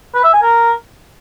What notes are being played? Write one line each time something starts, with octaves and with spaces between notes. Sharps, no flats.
B4
E5
G#5
A#4